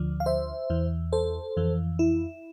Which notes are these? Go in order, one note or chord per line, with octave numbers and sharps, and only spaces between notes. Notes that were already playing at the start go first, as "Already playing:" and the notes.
Already playing: D2 D3 F3
F5
C5 E5
E2 E3
A4 C5
F2 E3
E4